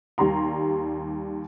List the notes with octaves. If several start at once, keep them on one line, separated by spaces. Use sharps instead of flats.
D#2 G3 A#5 C6